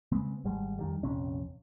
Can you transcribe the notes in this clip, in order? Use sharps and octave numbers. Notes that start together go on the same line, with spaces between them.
C#3 G#3 B3 C4
G#1 G#2 G3 G#3
F2 D#3 G3
A#1 F2 C3 C#4